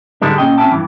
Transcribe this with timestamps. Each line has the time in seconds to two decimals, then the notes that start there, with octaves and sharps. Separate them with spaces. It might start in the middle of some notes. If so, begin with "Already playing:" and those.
0.22 G#2 D3 G3 G#3 D4
0.38 A#2 F#3 C#4 D#5 G5
0.58 C4 C#4 E5 G5 A5
0.72 G2 A#2 E3